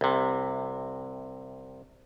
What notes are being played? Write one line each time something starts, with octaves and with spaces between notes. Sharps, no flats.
C2 C3